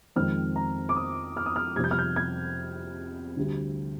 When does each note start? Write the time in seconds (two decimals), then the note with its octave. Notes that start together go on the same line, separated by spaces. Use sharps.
0.16 F2 D#3 G#3 C4 F6
0.56 A#5
0.89 D6
0.96 D#6
1.37 F6
1.46 D#6
1.56 F6
1.76 F2 C3 G3 G#6
1.84 G6
1.91 F6
1.99 G6
2.16 G#6
3.37 D2 D3 G3